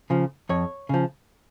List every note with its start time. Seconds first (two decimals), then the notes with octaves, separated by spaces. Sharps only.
0.10 C#3 F3
0.49 F2 C#5
0.89 C#3 F3